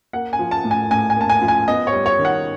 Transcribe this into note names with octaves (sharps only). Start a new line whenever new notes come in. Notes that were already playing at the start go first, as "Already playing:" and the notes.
A#3 F#5
G#5
F3
A5
A2
G#5
A2 G#5
G#5
A#3 A5
G#5
F3
G#5
B3 D#5
C#5
G3
C#5
D#3
F#5